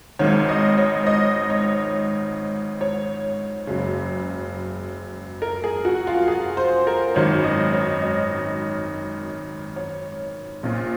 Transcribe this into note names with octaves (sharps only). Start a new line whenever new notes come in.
G#1 G#2 D#3 C#5
D#5
C#5
D#5
C#5
C#5
F#1 F#2 C#3
A#4
G#4
F#4
F4
G#4
C5
A#4
G#1 F#2 D#3 C#5
D#5
C#5
D#5
C#5
A#1 A#2